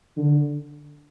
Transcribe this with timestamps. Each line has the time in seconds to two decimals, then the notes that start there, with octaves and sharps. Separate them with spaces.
0.17 D3